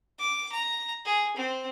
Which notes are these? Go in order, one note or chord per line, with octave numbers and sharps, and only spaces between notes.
D6
A#5
G#4
C4